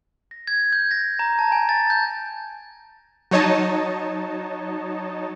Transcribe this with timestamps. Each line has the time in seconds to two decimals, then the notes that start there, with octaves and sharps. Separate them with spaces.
0.31 A#6
0.47 G#6
0.72 G6
0.91 A#6
1.19 A#5
1.39 A5
1.52 G#5
1.69 A6
1.90 G6
3.31 F#3 D#4 C#5 D#5 A5